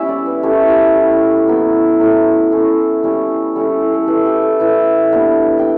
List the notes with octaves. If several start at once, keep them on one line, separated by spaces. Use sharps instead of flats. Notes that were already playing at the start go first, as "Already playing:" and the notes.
Already playing: G3 B3 C#4 E4 E5
D5
B4
A3 C#4 E4 G4
G4
G3 C#4 E4
F#3 B3 E4 B4
F#3 A3 E4
A3 C#4 E4
G3 C#4 E4
G3 C#4 E4 A4
G4
A4
A3 E4 B4
G4
A4
A3 E4 B4
G3 B3 D4
G5